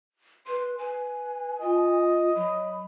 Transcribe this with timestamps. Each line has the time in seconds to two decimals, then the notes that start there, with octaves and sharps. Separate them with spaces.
0.47 B4 C6
0.78 B4 G#5
1.61 F4 D#5
2.36 F#3 B5